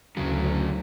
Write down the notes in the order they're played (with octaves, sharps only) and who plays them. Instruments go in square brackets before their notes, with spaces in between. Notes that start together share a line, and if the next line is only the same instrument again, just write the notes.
[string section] D2 [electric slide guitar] C#3 F#3